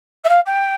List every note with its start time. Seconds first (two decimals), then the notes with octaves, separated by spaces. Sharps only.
0.24 E5
0.29 F5
0.46 G5